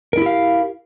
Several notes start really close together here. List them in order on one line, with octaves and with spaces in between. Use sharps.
A#4 E4 G4 F5